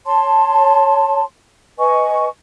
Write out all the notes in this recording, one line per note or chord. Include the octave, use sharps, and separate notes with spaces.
C#5 A5 C6
B4 D#5 G#5 C#6